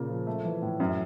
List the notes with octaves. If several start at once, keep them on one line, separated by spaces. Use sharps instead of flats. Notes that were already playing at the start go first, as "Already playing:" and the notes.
Already playing: A#2 C#3 A#3
F3
A3
E3
A2
F#2